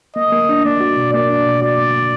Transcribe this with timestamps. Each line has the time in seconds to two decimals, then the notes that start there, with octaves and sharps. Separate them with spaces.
0.16 A#3 D#5
0.32 A#3
0.49 D4
0.64 A#3 D5
0.80 F#4
0.97 B2
1.13 A#3 D5
1.30 D4
1.46 B2
1.62 F#4 D5
1.78 A#3
1.95 A#3